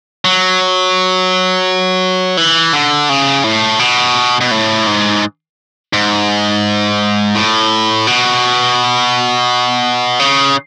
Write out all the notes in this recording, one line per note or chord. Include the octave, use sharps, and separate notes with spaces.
F#3
E3
D3
C#3
A2
B2
B2
A2
G#2
G#2
A2
B2
C#3